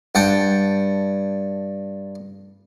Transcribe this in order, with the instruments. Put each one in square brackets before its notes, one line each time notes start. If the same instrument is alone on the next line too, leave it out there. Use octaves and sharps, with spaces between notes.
[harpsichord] G2 F#5 G5 A5